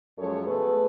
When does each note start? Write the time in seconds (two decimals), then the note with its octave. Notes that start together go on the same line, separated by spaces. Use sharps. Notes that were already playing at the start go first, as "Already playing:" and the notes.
0.17 F#2 F3 G#3 A4 C#5
0.46 B2 A3 G#4 B4